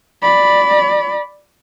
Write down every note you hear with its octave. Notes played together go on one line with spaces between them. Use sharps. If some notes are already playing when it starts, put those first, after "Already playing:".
D5 B5